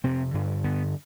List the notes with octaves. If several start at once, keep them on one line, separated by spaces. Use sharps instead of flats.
F2 C3 C4
G2 D3
G2 D3 B3